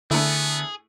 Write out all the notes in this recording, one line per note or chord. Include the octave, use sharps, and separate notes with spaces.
D3 A3 B3 D4 E4 G#4